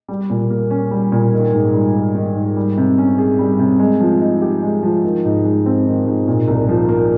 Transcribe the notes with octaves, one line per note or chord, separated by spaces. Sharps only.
G3
A#2
A#3
C#4
G3
A#2
D#3
G#2
G3
A#3
D#3
G#2
G3
C3
C#4
G#4
G3
C3
G#3
F3
D#4
G4
G#3
F3
D#3
G#2
G#3
C4
D#3
G#2
A#2
C2
F3
A#3